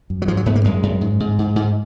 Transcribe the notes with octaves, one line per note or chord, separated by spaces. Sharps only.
F#2
F#3
G#2 F3
F#3
G#2 B3
A#3
F#2 G#3
F#2
G#2
G#2
G#2
G#2